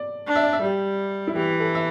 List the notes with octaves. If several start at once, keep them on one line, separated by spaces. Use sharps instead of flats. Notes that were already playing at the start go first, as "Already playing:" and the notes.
Already playing: D5
D4
E5
D5
E5
G3 G4
E4
E3 G4
A4
E5